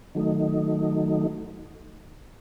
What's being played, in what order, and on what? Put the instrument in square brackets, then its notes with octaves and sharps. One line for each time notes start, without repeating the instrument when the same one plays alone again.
[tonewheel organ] D#3 F#3 A3 D#4